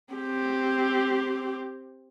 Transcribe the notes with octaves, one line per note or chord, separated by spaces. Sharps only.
C4 G4